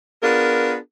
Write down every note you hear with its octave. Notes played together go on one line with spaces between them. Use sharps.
B3 D4 F4 G#4 A#4